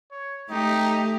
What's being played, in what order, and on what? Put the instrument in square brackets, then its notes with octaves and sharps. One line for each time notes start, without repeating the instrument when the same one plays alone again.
[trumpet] C#5
[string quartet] A3 G4 [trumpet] D#4